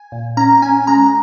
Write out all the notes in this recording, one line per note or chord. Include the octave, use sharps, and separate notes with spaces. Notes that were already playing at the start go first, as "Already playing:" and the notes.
Already playing: G#5
A#2
C#4 A#5
C#4 G#5
G#3 A#5